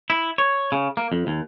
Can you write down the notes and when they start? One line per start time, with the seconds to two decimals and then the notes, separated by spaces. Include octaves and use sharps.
0.10 E4
0.38 C#5
0.72 C#3
0.97 A#3
1.12 F2
1.27 D#2